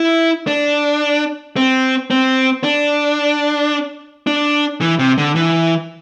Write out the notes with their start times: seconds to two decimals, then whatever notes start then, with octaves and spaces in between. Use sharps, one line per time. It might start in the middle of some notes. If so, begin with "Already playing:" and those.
Already playing: E4
0.47 D4
1.56 C4
2.11 C4
2.64 D4
4.27 D4
4.81 E3
4.99 C3
5.18 D3
5.36 E3